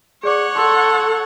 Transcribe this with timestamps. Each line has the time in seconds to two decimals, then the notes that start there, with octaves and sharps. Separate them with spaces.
0.23 G#4 C#5 D5 F#5 D6
0.56 A4 C6